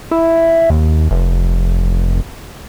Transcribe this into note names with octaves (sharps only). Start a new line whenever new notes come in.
E4
D#2
F1